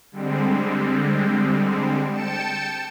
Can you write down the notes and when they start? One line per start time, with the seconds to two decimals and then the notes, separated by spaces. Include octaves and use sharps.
0.11 D3 G3 G#3 C4
2.12 G5 A5 C#7 E7